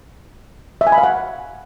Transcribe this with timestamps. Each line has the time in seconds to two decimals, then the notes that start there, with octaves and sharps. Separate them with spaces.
0.81 E5
0.87 G#5
0.92 B5
0.98 F5
1.03 F#5